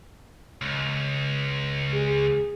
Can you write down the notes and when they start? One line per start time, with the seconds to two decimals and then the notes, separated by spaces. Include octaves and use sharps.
0.62 C#2
1.94 G#4